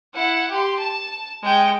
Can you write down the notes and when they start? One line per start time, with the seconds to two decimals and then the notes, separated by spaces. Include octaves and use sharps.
0.15 E4 F#5
0.51 G4 C6
0.80 A5
1.43 G#3 G5